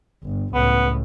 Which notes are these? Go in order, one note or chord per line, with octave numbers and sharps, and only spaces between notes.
G1
C#2 A2 B3